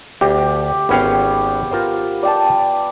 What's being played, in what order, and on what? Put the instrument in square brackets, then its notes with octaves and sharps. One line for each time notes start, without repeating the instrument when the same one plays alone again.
[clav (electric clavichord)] D2 [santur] G4
[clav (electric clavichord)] G#1 C#4 F5 [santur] B3 G5
[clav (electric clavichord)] F4 A#4 C5
[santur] D5 G5 A5